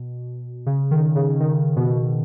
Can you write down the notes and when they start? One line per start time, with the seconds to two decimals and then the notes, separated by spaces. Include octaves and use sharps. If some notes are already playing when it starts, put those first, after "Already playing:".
Already playing: B2
0.66 C#3
0.91 D#3
1.16 C#3
1.40 D#3
1.76 B2